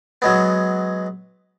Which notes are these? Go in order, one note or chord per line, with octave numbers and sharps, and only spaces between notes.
F#3 G#3 B3